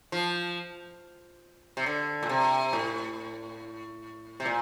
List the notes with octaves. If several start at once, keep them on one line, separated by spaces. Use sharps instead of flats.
F3
C3
D3
A#2
C3
A2
C3
A#2